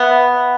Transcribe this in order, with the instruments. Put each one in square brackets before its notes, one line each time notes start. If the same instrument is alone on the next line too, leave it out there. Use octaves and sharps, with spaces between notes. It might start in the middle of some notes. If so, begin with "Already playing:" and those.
Already playing: [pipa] B3 [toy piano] E5